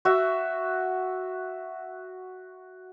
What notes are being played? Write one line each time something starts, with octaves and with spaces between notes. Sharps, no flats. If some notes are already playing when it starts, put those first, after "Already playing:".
F#4 E5